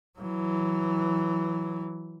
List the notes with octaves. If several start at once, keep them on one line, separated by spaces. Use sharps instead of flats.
E3 F#3